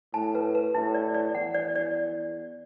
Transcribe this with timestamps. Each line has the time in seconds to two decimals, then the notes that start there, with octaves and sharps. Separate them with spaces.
0.14 A2 A5
0.35 B4
0.55 B4
0.75 A2 E4
0.94 D5
1.14 D5
1.35 E2 F#5
1.54 D5
1.75 D5